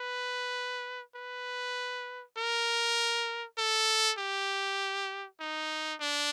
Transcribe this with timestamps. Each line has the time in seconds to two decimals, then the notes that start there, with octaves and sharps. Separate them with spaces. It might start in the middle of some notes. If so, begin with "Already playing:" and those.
Already playing: B4
1.16 B4
2.37 A#4
3.58 A4
4.18 G4
5.40 D#4
6.01 D4